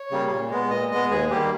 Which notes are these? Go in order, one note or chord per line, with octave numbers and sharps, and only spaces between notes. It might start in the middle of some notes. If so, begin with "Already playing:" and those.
Already playing: C#5
C#3 G3 A#3
A#2
G#3 B3
A#2 D#5
G#3 B3 D#5
D#2 G#4
D#3 G3 A#3 G4